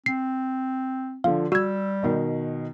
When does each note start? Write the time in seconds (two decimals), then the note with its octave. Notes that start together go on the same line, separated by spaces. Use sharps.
0.06 C4 C7
1.24 D3 F3 F5
1.52 G3 F#4 E6 G#6
2.03 B2 D#3